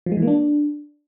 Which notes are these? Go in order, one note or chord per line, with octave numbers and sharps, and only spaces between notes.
F3
G#3
E3
A#3
D4